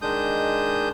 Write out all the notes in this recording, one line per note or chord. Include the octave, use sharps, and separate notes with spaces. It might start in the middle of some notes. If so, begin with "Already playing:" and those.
D#3 G#3 D4 D#6 G6